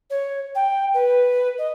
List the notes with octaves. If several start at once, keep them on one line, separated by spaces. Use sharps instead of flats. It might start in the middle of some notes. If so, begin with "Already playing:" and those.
C#5
G5
B4
D#5